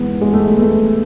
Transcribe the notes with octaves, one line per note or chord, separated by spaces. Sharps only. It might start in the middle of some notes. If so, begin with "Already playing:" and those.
Already playing: G#2 E3 B3
G#3
A3
B3
A3